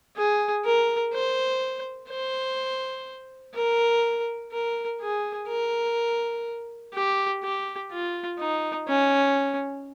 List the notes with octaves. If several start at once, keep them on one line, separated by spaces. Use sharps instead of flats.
G#4
A#4
C5
C5
A#4
A#4
G#4
A#4
G4
G4
F4
D#4
C#4